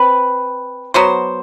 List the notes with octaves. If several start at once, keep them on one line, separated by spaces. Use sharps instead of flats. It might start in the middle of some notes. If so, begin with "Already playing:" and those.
Already playing: C4 B4
F#3 B3 F#4 C5